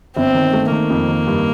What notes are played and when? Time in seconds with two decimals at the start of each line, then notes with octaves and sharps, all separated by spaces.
0.17 G1 C4
0.35 D#3
0.53 A3
0.72 D#3 A#3
0.90 F2
1.08 D#3
1.27 G2